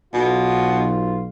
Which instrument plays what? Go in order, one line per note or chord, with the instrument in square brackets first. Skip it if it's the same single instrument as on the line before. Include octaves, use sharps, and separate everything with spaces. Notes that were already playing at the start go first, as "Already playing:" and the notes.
[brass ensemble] B1 F4 [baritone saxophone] B2